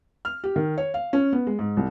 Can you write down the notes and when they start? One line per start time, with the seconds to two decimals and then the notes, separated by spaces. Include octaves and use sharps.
0.25 F6
0.44 G4
0.56 D#3
0.78 C#5
0.94 F5
1.13 C#4
1.33 B3
1.47 G#3
1.59 G#2
1.77 C2